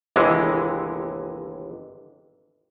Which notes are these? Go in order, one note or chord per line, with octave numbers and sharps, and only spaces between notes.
G1 D#2 C3 E3 G#3